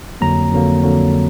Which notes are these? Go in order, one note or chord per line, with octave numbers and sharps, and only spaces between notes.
F2 D3 F#3 A#3 A#5
F2 D3 F#3 A#3
F2 D3 F#3 A#3